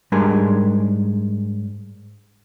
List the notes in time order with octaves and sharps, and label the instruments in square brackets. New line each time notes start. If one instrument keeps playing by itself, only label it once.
[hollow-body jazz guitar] G#2 G3 G#3 D4 A#4 G#5